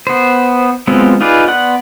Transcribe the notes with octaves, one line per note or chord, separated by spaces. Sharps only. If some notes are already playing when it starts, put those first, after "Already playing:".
B3 C5
F#3 G#3 B3 C4 F4
D#4 F4 G#4 B4 D5
B3 D5 F#5 C6 F#6